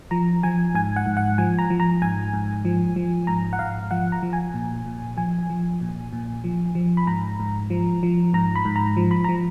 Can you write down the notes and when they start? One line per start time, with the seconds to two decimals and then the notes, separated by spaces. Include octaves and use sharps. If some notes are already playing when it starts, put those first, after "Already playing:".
0.11 F3 A#5
0.43 F3 G#5
0.75 G#2 G#5
0.96 F#5
1.06 G#2
1.17 F#5
1.38 F3 G#5
1.59 A#5
1.70 F3
1.80 A#5
2.02 G#2 G#5
2.34 G#2
2.65 F3
2.96 F3
3.27 G#2 A#5
3.53 F#5
3.59 G#2 F5
3.91 F3 F#5
4.12 A#5
4.23 F3
4.33 G#5
4.54 A#2
4.86 A#2
5.17 F3 G#5
5.50 F3
5.81 A#2
6.13 A#2
6.44 F3
6.75 F3
6.97 B5
7.07 G#2 A#5
7.40 G#2
7.70 F3
8.03 F3
8.34 G#2 A#5
8.56 B5
8.65 G#2
8.76 A#5
8.97 F3
9.11 B5
9.24 F3 A#5